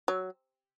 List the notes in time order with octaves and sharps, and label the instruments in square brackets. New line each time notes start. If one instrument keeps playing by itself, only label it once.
[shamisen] F#3